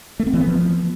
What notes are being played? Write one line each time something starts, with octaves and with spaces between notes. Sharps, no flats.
A3
C4
E3
B3
F3